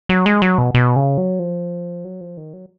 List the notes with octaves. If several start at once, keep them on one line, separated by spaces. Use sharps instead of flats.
F#3
G#3
F#3
B2
B2
C#3
F#3
F3
F#3
F3
D#3
F#3